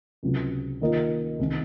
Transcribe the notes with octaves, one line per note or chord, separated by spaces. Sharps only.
C#2 C3 F#3
D#3 A#3 F4 A#4 D#5
C2 C3 D#3